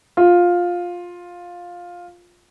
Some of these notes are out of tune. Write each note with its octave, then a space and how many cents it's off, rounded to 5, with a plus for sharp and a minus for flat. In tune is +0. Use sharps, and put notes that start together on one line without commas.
F4 +10